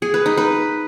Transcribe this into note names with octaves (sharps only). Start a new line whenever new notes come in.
G#4
B4
D#4
B4